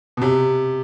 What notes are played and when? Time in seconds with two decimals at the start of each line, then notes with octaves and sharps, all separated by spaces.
0.17 B2
0.21 C3